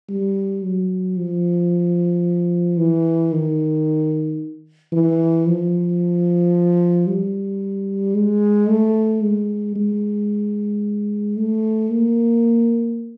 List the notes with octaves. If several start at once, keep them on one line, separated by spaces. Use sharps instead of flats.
G3
F#3
F3
E3
D#3
E3
F3
G3
G#3
A3
G#3
G#3
A3
A#3